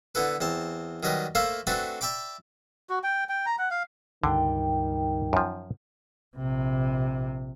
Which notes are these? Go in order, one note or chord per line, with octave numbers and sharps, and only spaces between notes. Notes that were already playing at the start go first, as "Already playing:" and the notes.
D3 B3 E4 A4 B4
E2 C4 A5
D#3 F#3 G3 B4 D#5
A3 A#3 C5 E5 F5
A3 C4 D4 F#4 A4 B4
D5 E5 G5 B5 D6
F#4
G5
G5
A#5
F#5
F5
C#2 G2 D3 D#3 G3 G5
F#2 F3
A#1 C3